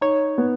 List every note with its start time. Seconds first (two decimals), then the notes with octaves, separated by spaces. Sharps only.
0.01 D#4 C#5
0.38 B3